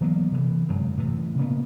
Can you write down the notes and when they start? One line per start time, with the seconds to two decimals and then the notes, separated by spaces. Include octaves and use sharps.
0.01 E3 F#3 A#3 B3
0.31 C3 E3
0.69 G1 F#2 F#3 G#3
0.97 A2 C3 E3
1.38 C#3 A#3 B3